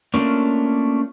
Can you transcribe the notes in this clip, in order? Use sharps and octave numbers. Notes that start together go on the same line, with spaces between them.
A3 A#3 C#4 D4 F4